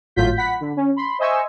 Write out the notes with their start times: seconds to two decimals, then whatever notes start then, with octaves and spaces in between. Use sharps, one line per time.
0.16 G#1 A2 F#3 F4 G6 B6
0.37 F#5 B5 B6
0.60 D3
0.76 C#4
0.96 B5 C6
1.19 C5 D#5 E5 G#5 C#6 E6